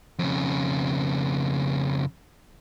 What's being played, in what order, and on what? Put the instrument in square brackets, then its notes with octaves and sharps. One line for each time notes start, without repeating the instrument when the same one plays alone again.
[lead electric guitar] F2 C#3